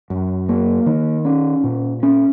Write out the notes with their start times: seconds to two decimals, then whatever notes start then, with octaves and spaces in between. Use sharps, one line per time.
0.10 F#2
0.49 A#3
0.86 D#3
1.25 C#4
1.64 A#2
2.03 C#4